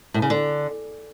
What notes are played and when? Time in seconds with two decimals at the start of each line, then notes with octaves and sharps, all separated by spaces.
0.14 A2
0.22 C#3
0.30 D3